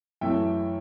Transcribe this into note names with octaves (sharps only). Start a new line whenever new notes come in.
F#2 E3 A3 E5 G5